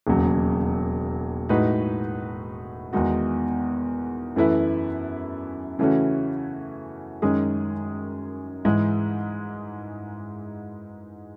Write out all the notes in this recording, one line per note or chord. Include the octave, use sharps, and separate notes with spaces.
E1 D#2 C#3 F#3
A2 G#3 D#4 F#4 B4
E2 D#3 G#3 D#4 F#4
F#2 E3 A3 E4 B4
C#3 E3 A3 C#4 F#4
F#2 D#3 G#3 C#4 G#4
G#2 E3 G#3